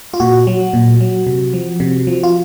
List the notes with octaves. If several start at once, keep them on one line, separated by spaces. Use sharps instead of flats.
F4
A#2 F#4
F#3
A#2
F#3
C3
F3
C3
F3
F4